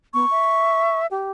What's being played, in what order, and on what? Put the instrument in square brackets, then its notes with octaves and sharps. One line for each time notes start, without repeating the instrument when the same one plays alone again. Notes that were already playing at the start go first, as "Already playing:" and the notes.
[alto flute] B3 [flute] C#6
[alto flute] E5
G4